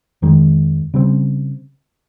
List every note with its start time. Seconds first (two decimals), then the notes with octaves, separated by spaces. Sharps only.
0.22 F2 D#3 G#3
0.94 C#3 G3 C4